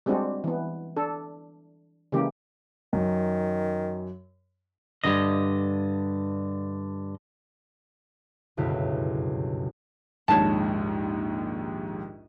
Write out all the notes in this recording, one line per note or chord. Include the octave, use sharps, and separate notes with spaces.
G3 G#3 C4 D4 F#4
E3 B3
D4 A4
C#3 E3 G#3 A#3 G4
F#2 D#3
G2 D3 D#3 D#5
G1 C#2 F#2 B2 E4 B6
A#1 D#2 G#2 C#5 A5